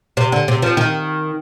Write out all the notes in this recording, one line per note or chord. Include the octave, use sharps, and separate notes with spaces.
C3
D3
C3
F3
D#3